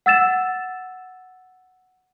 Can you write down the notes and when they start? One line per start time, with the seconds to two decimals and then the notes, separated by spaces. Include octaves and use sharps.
0.06 F#5 E6 A6 E7